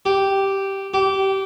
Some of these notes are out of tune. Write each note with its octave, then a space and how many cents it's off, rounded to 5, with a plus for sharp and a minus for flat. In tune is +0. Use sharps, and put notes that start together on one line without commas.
G4 -5
G4 -20